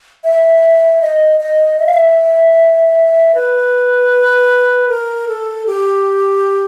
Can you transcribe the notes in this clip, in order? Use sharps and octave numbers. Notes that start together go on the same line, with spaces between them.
E5
D#5
D#5
E5
F5
E5
B4
A#4
A4
G4